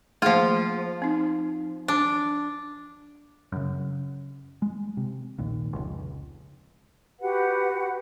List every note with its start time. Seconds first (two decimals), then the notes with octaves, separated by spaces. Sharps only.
0.22 F3 A3 A#3 F4 G#4
1.02 C4 D#4
1.88 D4
3.52 F#2 C#3
4.62 G#3
4.97 C3
5.38 A#1 D#2 A#2
5.73 F1 C#2
7.21 F#4 G4 B4 F#5